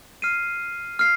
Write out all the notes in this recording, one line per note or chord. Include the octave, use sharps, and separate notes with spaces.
F6 C7 D#7
F6 C7